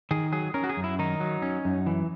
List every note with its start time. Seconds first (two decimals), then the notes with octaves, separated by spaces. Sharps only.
0.11 D#3 G#4
0.32 F#3 G#4
0.54 C#4 A#4
0.64 F#4
0.69 G#4
0.77 F#2
0.84 E4
0.99 D#3 D#4
1.20 F#3
1.42 C#4
1.65 F#2
1.87 E3